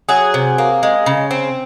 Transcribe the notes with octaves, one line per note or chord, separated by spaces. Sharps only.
F#3 G#4
C3
A#3
G#3
C#3
C4